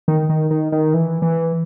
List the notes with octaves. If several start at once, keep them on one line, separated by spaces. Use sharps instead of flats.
D#3
D#3
D#3
D#3
E3
E3